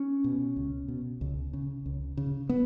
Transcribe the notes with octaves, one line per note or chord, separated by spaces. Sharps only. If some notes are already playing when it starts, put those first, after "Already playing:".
Already playing: C#4
B2
C#2
B2
C#2
C#3
C#2
C#3
B3